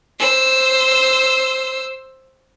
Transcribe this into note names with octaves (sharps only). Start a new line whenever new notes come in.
C5 E6